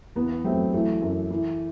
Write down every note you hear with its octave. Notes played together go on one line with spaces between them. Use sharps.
E2 B3
F#3 A3 C4
E3 A3
F#2
E3